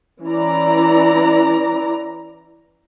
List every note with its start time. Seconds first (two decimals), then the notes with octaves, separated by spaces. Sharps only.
0.24 E3 C#4 E4 D5 A#5